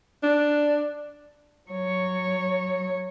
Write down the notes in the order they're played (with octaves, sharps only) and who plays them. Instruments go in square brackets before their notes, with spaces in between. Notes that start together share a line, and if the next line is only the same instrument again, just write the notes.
[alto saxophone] D4
[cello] F#3 C#5